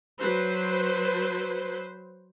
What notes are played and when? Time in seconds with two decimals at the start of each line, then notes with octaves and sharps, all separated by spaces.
0.19 F#3 B4 C5